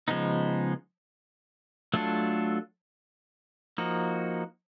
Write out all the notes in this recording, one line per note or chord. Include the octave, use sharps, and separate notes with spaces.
C#3 F3 G#3 B3 D#4
F#3 A3 D4 F4 A4
F3 A#3 D#4 F#4